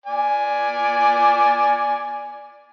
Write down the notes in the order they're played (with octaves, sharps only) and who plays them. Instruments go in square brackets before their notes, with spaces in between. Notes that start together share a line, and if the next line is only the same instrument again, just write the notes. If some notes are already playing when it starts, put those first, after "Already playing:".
[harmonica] D5 G#5